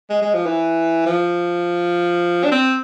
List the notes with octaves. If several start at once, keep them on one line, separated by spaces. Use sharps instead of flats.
G#3
G#3
F3
E3
F3
D4
C4